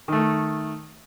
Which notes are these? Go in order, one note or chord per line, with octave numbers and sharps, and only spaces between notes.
D#3 A3